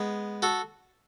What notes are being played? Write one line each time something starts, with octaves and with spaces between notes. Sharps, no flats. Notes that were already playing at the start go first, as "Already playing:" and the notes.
Already playing: G#3 B3
F#4 A4